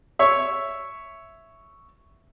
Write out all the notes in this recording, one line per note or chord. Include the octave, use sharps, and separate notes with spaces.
C#5 E5